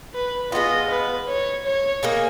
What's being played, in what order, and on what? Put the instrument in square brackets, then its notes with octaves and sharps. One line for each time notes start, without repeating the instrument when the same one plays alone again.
[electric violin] B4
[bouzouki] G#3 B3 F4 [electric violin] D#5
[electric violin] B4
C#5
C#5
[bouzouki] A#3 D#4 G#4